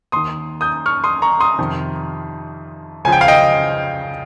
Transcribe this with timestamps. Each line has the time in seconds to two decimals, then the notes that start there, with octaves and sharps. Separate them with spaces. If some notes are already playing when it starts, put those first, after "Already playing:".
0.12 D#2 C6 D#6
0.16 D#3
0.61 D#6 G6
0.86 C#6 F6
1.04 C6 D#6
1.22 A#5 C#6
1.40 C6 D#6
1.58 F2 C3 D#3
3.05 C#2 C#3 F3 G#5
3.12 G5
3.21 F5
3.28 D#5 G5